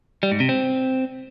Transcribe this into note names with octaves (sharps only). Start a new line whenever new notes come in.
G3
G#2
C3
C4